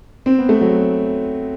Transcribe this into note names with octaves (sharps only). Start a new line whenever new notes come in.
C4
B3
A3
F#3